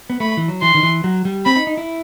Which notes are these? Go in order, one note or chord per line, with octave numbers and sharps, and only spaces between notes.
B3
A3 B5
E3
F#3
E3 C6
D#3
E3
F#3
G3
C4 B5
D#4
D#4
E4